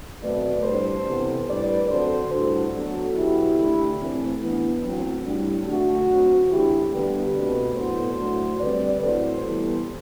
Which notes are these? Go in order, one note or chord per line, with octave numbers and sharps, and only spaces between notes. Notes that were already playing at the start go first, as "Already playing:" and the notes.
B2 F#3 A3 C4 B4 D5
A2 G3 D4 A4 C5
C3 E3 B3
A2 G3 D4 B4 D5
D3 F#3 C4 A4 C5
A2 G3 D4 F#4 A4
D3 F#3 B3 D4
B2 F#3 B3 E4 G4
D3 A3 D4
A2 E3 A3 C4
E3 B3 D4
A2 F#3 C4
A2 G3 D4
D3 F#3 A3 D4 F#4
D3 F#3 C4
E3 A3 D4 E4 G4
D3 G3 B3 D4 G4 B4
B2 A3 C4
A2 F#3 B3 D4 A4 C5
A2 F#3 A3 D4
D3 G3 C4 B4 D5
A2 F#3 A3 C4 A4 C5
E3 G3 B3